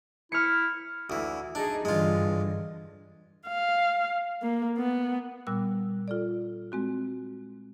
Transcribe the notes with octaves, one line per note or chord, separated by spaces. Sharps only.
E4 F6 C#7
D2 E3
D4 D#4 G#4
G2 D3 E3 G#3 F4
F5
A#3
B3
A#2 G3 B3 E6 F#6
F4 A4 D5
G#3 C4 F#4